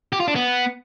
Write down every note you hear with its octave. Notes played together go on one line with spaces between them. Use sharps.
G4
F4
D4
B3